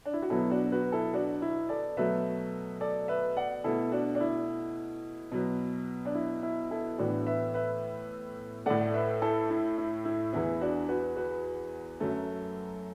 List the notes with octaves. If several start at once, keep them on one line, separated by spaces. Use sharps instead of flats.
D4
E4
F#4
B2 F#3 B3 E4 A4
D4 F#4
F#4 B4
E4 A4
D4 F#4
E4
A4 D5
B2 F#3 A3 B4 E5
A4 D5
B4 E5
D5 F#5
B2 A3 E4 A4
D4 F#4
D4
E4
B2 F#3 B3
D4
E4
E4
E4 A4
A2 E3 B3 D4 F#4
B4 E5
B4 E5
A2 A3 D5 F#5
B4 E5
E4 A4
E4
E4
E4
E2 E3 B3 E4
D4 F#4
F#4 B4
F#4 B4
F#2 F#3 A3